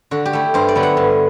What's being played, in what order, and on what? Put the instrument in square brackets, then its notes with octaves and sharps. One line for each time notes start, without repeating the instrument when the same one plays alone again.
[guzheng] D3 F#4
G4
A3 E4
G2 C5
D5
D3 F#3 B3 E4
F#5
G2